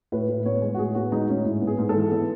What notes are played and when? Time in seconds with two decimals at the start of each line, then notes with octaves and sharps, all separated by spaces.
0.12 A2 B4
0.29 A2
0.45 B3 C#5
0.62 G#3
0.75 F#4
0.79 A2 G#4
0.95 B3 F#4
1.12 G#3 D#4
1.29 A2 C#4
1.45 G#2 E4
1.61 B3
1.67 G#4
1.79 G#2
1.89 A4
1.95 E3
2.11 B3